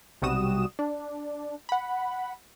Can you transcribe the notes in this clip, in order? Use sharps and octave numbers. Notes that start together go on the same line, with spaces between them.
B1 C3 G3 F#4 D#6 E7
D4
F#5 B5